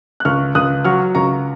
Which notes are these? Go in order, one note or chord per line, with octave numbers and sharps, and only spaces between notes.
F#6
C#2 C#6 F6
C#2 D#6 F#6
F#3 C#6 F6
C#2 A#5 C#6